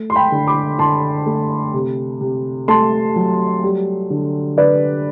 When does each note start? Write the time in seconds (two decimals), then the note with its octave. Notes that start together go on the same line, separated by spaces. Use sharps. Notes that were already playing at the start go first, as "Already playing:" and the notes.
Already playing: A3
0.10 C6
0.16 G5 B5
0.32 D3
0.47 B5 D6
0.79 D3 A5 C6
1.26 A3
1.74 C3
2.21 C3
2.68 A3 A5 C6
3.16 F#3
3.63 G3
4.10 D3
4.58 D3 B4 D5